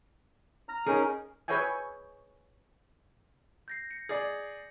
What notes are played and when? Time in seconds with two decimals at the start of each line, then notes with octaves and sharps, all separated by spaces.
0.69 A#5 F6
0.87 C#4 D#4 G#4 A#4
1.48 G#4 B4 C#5 E5 G5 G#5
3.68 G6 A#6 C7
3.91 C#7
4.09 G#4 D5